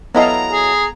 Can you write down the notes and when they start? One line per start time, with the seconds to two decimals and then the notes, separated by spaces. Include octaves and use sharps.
0.15 F#3 B3 E4 A4 D#5 F5 A#5
0.52 G#4